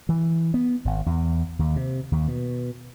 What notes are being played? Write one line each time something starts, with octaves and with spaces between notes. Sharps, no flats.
E3
B3
G#1
E2
D#2
C3
D#2
B2